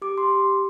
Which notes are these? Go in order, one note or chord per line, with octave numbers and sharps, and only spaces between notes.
G4 D6
G4 C6